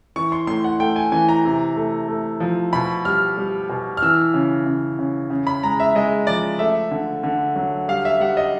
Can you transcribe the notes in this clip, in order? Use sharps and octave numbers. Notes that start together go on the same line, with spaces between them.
E3 C#6
C6
A2 C6
F#5
A3 G5
G#5
E3 G#5
A#5
C3
A3
A3
F3
B2 B5
G3 F6
G3
B2
F6
E3 E6
C#3
C#3
C#3
C#3
B5
G#3 A#5
E5
G#3 D#5
F3 D5
A3 E5
D3
D3
F#3
G3 F5
E5
G3 F#5
D#5